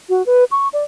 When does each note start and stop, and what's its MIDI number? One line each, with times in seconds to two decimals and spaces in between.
0.09 0.25 66
0.26 0.44 71
0.51 0.68 85
0.73 0.84 74